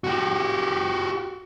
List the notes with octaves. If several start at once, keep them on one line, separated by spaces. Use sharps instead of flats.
F#4 G4